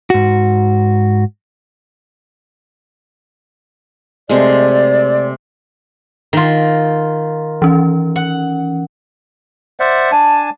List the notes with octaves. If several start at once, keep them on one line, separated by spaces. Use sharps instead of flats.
G#2 F#4
C3 G#3 A3 D5
D#3 F4
E3 C#4
F#5
C5 D5 E5 F#5
D4 G#5 A5